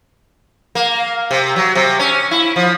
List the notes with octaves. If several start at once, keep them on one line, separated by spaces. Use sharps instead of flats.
A#3
C3
F#3
C3
C#4
E4
F3